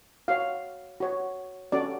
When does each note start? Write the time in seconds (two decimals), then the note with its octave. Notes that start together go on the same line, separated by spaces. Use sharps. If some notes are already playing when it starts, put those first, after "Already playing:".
0.28 F#4 C#5 F5
1.00 F#4 C#5
1.72 C#4 F#4 A4 D5